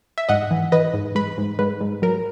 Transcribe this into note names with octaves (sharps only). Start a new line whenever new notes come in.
E5
G#2 D#5 F#5
E3
E3 B4 D#5
G#2
G#3 B4
G#2
G#2 B4
G#2
F#3 A#4